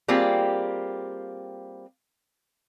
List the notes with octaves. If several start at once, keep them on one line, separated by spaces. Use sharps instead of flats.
G3 A#3 C4 F4 G4 G#4